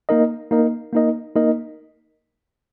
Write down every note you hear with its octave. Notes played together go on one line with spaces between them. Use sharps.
A#3 D#4 A#4 D#5
A#3 D#4 A#4 D#5
A#3 D#4 A#4 D#5
A#3 D#4 A#4 D#5